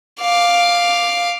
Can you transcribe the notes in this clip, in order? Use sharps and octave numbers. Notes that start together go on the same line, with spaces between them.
F5 D6